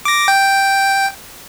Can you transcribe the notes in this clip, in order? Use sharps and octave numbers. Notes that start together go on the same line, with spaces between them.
D6 A#6
G5